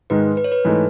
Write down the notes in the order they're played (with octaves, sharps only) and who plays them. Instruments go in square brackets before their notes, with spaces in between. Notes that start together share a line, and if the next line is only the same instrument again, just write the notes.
[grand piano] G#2 D#3 G#3 [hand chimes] B4
[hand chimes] B4
C#5
B4
[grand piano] G#2 E3 A3 D#4